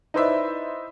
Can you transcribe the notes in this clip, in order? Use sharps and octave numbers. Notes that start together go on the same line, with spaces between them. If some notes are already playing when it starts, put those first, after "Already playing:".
D#4 E4 B4 C5 D5 E5